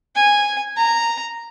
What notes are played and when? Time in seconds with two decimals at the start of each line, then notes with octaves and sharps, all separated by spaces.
0.16 G#5
0.77 A#5